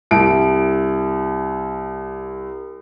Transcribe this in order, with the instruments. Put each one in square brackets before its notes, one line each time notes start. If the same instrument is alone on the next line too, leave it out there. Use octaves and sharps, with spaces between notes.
[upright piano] C2 D7